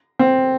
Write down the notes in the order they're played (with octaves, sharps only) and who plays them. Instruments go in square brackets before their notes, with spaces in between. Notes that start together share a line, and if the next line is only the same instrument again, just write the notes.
[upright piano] C4